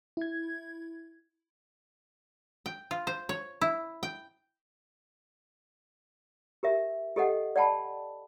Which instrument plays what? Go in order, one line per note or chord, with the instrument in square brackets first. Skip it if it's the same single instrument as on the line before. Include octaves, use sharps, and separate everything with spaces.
[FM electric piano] E4 G#6
[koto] G5
F4
C5
C#5
E4
G5
[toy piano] G4 A#4 E5
G4 A4 D#5 F#5 G5
D5 F#5 G5 A5 B5